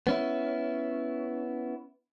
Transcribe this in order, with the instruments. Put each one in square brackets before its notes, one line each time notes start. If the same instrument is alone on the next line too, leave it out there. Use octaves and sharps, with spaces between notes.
[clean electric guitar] B3 C#4 E4